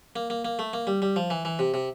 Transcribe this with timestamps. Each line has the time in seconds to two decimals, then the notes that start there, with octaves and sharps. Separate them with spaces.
0.16 A#3
0.30 A#3
0.45 A#3
0.59 A3
0.73 A#3
0.87 G3
1.02 G3
1.16 F3
1.30 E3
1.45 E3
1.59 C3
1.74 C3